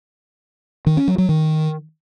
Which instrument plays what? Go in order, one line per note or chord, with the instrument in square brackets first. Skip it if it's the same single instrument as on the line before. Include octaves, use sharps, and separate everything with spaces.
[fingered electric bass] D#3
C#4
F#3
F#3
D#3